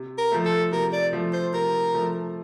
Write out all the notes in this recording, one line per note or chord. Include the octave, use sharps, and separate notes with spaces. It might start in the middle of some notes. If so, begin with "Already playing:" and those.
Already playing: C3
A#4
F3 A3
A4
C3 A#4
D5
F3 A3
C5
C3 A#4
F3 A3